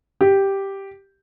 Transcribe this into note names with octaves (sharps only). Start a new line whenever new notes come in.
G4